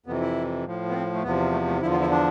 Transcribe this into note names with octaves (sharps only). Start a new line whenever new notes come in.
F2 C3 E3 B3
E4
A2 F3
B3
C4
A3
E2 C3 F3 B3
A3
A3
E2 D3 F3 E4
F4
E4
D4